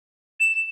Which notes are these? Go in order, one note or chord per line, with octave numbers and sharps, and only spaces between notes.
E7